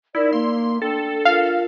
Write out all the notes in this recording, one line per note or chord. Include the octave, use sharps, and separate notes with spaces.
D#4 E4 A#4 D5
A#3 F5 C6
D4 A4 G5
F4 A#4 F5